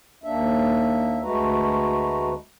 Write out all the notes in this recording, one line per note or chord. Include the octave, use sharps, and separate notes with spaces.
D#2 A#3 D4 E5
D2 G#3 A3 F#4 B4 A#5